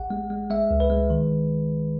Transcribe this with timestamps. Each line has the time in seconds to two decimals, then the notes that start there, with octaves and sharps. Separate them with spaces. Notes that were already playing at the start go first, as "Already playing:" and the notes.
Already playing: A1 F#5
0.10 G#3
0.30 G#3
0.50 G#3 E5
0.71 C#2
0.80 B4
0.90 G#3
1.10 D#3